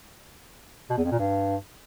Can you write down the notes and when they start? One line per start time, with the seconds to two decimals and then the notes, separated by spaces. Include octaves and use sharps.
0.90 B2
0.97 E2
1.04 F2
1.12 A#2
1.19 G2